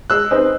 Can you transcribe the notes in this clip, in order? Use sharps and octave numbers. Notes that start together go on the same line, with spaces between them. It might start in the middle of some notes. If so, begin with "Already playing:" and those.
G#3 E6 F#6
C4 D#4 G#4 B4